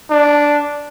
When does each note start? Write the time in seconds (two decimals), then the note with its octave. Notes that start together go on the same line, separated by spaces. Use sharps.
0.11 D4